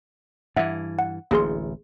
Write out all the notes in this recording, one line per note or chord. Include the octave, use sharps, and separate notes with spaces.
G2 E3 E5 F#5
F#5
D1 A1 A#3 G#4 C6